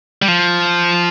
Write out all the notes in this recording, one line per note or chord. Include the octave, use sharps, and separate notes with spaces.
G3
F3